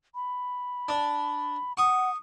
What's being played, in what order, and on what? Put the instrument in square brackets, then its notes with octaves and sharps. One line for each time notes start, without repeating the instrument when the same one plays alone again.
[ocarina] B5
[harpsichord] D4
[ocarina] F#5 [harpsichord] C#6 D#6